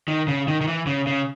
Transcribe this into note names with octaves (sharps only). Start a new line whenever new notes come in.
D#3
C#3
D#3
D#3
E3
C#3
C#3